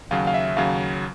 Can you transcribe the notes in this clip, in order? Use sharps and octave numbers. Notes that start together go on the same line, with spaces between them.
D#2 C#3 F#3 F5
F5
E5
D#2 C#3 F#3 F5